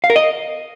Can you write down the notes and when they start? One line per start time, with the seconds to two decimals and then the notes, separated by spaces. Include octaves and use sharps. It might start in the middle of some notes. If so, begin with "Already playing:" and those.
0.04 F5
0.10 A#4
0.16 D#5